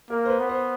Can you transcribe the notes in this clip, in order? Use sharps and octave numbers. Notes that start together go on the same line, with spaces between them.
A#3 A#4
C5
B4
B3
C5